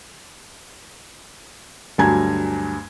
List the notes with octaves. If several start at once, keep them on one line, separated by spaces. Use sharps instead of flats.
D2 G2 F#3 G#5 A#5 G#6